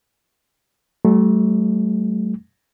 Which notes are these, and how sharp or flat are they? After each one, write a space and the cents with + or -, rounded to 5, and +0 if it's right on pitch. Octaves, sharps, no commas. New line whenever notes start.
F#3 +45 A3 -20